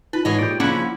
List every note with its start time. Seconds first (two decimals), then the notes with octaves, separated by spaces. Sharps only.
0.13 D#4 F4 B4
0.25 G#2 E3 G#4 C#5 D#5
0.39 A#2 G4 D5
0.60 C#3 F3 A#3 C#4 D4 E4 F#5